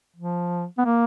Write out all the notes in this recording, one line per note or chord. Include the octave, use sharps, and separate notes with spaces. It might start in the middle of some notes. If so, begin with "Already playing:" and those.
F3
B3
A#3